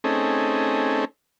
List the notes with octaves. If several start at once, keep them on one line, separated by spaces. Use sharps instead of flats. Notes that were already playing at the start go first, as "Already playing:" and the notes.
A3 C4 C#4 D#4 G#4 A4